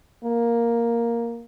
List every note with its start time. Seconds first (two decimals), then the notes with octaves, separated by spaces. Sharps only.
0.24 A#3